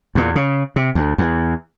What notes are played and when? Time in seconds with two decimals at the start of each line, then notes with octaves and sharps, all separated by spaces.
0.15 E2 A#2
0.36 C#3
0.76 C3
0.95 D2
1.18 E2